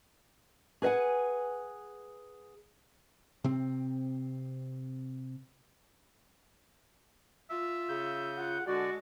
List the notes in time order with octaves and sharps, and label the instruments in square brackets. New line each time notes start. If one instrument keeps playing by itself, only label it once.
[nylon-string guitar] G#4 B4 E5 F#5 G#5
[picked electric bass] C3 C4
[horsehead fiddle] F4 [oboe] E5
[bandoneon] C#3 G6
[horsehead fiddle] F4 [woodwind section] F#5
[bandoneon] D3 D5 [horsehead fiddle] G#3 A4 [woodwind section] F#4